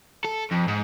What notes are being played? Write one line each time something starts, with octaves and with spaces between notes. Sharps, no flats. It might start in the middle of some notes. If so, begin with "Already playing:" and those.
A4
F2
G#2